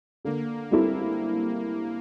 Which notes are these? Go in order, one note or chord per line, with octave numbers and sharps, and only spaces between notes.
D3 A#3
G3 C4 E4 A4